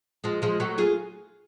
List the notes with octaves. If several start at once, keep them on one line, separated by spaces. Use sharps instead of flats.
F3 G#3
F3 G#3
F#3 A3
F4 G#4